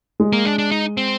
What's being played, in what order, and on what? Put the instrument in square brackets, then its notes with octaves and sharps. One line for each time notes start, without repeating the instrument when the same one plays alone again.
[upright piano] G#3
[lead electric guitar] A#3
D4
D4
D#4
C4